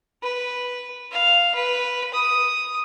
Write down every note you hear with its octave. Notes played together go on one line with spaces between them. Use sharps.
B4
F5
B4
D#6